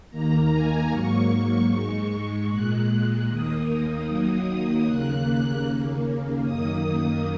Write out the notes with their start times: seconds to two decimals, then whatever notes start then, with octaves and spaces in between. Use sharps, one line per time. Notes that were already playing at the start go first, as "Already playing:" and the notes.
0.10 D#2 D#3 A#3 A#5
0.51 G#5
0.90 G#2 F#3 A#3 C#6
1.69 G#2 G#3 C#6
2.48 A#2 G#3 F#6
3.27 D#2 D#3 A#3 D#6
3.67 D#6
4.06 D#2 D#3 F#3 A#3 D#6
4.85 D#2 C#3 A#3 F#6
5.64 D#2 C#3 A#3
6.43 F#2 D#3 A#3 D#6